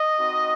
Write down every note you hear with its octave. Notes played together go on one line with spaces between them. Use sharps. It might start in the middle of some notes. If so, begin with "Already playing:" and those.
Already playing: D#5
C4 D#4 F#4